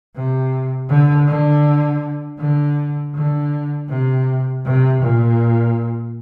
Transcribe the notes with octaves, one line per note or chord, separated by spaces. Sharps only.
C3
D3
D3
D3
D3
C3
C3
A#2